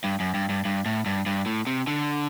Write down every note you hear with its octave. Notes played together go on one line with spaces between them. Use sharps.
G2
F#2
G2
G2
G2
A2
G2
G2
A2
C3
D3